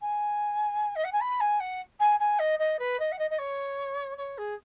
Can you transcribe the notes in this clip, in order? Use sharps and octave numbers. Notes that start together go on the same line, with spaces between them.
G#5
D#5
F#5
G#5
B5
G#5
F#5
G#5
G#5
D#5
D#5
B4
D#5
F#5
D#5
D#5
C#5
C#5
G#4